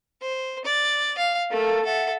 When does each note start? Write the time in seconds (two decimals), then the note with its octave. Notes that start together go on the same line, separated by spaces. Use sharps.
0.21 C5
0.65 D5
1.18 F5
1.51 A3 A4 A#4 F5
1.85 A4 E5 F#5